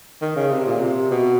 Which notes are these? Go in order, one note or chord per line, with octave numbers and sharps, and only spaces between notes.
D#3
C#3
C3
A#2
C3
B2